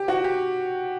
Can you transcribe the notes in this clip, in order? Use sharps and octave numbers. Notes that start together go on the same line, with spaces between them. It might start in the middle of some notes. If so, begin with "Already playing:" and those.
Already playing: G4
F#4
G4